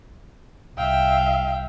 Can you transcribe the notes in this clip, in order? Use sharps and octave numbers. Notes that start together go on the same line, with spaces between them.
C2 E5 F5 G5